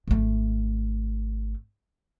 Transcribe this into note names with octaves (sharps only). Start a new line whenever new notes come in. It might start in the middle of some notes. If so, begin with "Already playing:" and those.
G#1 A3